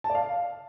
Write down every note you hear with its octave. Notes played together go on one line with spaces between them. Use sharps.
A5
D5
F5